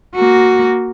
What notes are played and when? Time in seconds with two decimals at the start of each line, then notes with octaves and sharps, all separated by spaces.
0.15 A#3 F#4